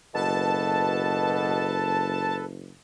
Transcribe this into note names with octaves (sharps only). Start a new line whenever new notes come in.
F#1 B2 A4 B4 A5